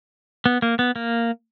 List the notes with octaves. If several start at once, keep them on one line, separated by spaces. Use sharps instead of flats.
B3
A#3
B3
A#3